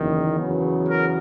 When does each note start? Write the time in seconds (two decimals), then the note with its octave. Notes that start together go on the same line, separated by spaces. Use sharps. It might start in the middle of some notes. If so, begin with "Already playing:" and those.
Already playing: F#1 E2 D#3
0.36 E2 C#3 F#3 B3
0.89 A#4